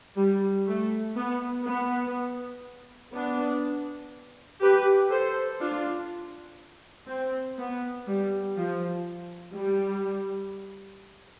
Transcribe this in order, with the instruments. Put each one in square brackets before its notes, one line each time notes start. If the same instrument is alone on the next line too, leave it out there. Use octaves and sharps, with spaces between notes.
[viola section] G3
A3
B3
B3
B3 D4
G4 B4
A4 C5
D4 F4
C4
B3
G3
F3
G3